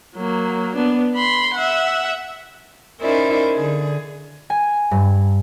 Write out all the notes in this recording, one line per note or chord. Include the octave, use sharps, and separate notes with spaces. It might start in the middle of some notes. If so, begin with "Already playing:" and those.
F#3 A#3
B3 D4
B5 C6
E5 F#5
C#4 D#4 E4 A#4 C5 D5
D3 G#4
G#5
G2